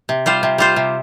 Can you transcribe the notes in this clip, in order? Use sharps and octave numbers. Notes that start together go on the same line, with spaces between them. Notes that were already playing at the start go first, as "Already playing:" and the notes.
C3
G3 F4 C5
C3
G3 F4 C5
C3